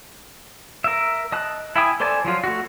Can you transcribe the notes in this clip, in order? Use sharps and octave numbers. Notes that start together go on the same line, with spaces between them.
A#4 E5
D#5 A5 F#6
E4 E5 G5 G#5 D#6
A4 C5 D5 G#5 A5
F3 F#3 F4
A3 F#4